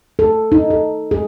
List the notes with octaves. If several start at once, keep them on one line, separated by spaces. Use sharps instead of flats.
A4
D#4
A4
G#4